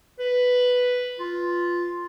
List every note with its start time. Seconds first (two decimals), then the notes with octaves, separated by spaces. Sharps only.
0.19 B4
1.19 F4